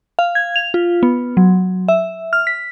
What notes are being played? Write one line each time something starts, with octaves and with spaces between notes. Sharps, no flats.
F5
G#6
F7
F4
B3
F#3
E5
F6
B6